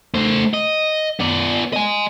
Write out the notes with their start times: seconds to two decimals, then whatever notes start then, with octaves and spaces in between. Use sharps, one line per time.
0.14 A3 C5
0.54 D#5
1.20 B3 D5
1.73 D#5 G#5